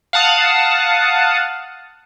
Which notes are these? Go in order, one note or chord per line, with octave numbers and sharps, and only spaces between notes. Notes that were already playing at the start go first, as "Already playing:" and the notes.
F5 F#5 A5 D#6